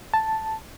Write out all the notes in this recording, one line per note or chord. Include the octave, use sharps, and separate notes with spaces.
A5